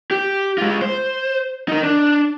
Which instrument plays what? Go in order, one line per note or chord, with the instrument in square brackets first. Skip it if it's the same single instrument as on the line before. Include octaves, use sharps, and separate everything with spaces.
[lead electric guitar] G4
G#3 F4
C5
D#4 A#4
D4